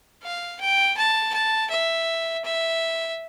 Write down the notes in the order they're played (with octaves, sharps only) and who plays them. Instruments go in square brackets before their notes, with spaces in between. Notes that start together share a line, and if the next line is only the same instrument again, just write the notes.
[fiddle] F5
G5
A5
A5
E5
E5